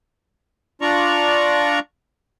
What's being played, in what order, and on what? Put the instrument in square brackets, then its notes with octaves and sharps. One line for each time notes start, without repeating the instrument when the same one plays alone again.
[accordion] D4 F4 D5 A#5 C#6